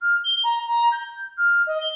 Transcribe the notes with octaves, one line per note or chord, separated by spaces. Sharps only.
F6
G7
A#5
A#5
G6
F6
D#5
G7